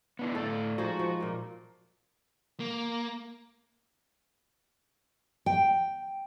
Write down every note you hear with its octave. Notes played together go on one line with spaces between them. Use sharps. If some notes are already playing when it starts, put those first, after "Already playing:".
B3 D4 E4
A2 A4 D5
F3 G#3 D#4 F#4
F3
A#2 A#3
A#3
G5